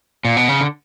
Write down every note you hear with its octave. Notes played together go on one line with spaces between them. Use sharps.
A#2
B2
C#3
D3